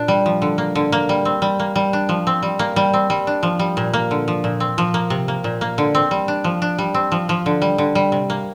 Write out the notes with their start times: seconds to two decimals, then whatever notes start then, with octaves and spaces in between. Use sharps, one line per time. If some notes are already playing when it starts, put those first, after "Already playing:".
Already playing: A#2 D4
0.08 G3
0.26 F3
0.42 D3
0.58 A#3
0.75 D3
0.92 A#3
1.09 G3
1.25 C4
1.42 G3
1.60 A#3
1.76 G3
1.93 D4
2.09 F3
2.27 C4
2.43 G3
2.59 A#3
2.76 G3
2.93 C4
3.10 G3
3.27 D4
3.43 F3
3.59 G3
3.77 A#2
3.94 A#3
4.11 D3
4.28 F3
4.44 A#2
4.60 C4
4.78 F3
4.94 A#3
5.10 C3
5.28 A#3
5.44 A#2
5.61 A#3
5.78 D3
5.95 C4
6.11 G3
6.28 D4
6.44 F3
6.62 D4
6.78 G3
6.94 C4
7.12 F3
7.29 F3
7.46 D3
7.62 G3
7.78 D3
7.95 G3
8.12 C3
8.30 A#3